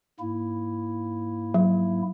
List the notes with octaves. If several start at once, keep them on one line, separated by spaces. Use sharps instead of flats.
G#2 A#3 E4
F#3